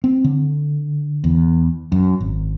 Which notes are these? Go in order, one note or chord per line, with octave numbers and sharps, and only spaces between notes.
C4
D3
E2
F#2
G#1